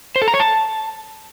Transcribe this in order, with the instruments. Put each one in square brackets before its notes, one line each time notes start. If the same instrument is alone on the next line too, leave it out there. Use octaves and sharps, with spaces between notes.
[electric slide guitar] C5
A4
A#5
C#5
A5